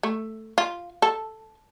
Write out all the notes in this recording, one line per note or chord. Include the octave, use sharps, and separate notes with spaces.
A3
F4
A4